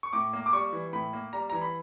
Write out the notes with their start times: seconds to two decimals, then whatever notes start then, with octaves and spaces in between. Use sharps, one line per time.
0.03 C#6
0.13 A2 D6
0.33 A#3
0.46 D6
0.53 G3 C#6
0.73 E3
0.93 A2 B5
1.13 A#3
1.33 G3 A#5
1.50 E3 A#5
1.62 B5